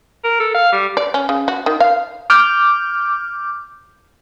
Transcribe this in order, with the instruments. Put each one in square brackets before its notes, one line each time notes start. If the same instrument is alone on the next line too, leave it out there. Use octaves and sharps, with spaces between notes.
[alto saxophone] A#4
A4
F5
G3
[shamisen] D5
C#4
C#3
F#4
D#3
F5
[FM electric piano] D6 F6 G6